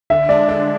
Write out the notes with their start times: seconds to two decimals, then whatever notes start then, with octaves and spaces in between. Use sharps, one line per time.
0.10 D3 E5
0.29 G#3 D4 D5
0.49 D3 D5